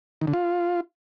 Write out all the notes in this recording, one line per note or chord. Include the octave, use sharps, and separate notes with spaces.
D#3
D3
F4